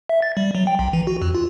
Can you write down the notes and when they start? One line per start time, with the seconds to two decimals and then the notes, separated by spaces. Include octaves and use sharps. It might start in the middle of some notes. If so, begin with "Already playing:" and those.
0.09 E5
0.22 A6
0.37 G3
0.55 F#3
0.67 G5
0.79 B1
0.93 E3
1.07 F#4
1.22 F2
1.35 F4